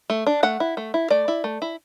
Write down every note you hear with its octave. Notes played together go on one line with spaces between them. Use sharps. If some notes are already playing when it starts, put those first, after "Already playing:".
A3
D4
A3 F#5
E4
A3
E4
A3 D5
E4
A3
E4